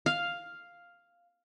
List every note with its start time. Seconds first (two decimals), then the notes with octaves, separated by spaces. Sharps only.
0.06 F5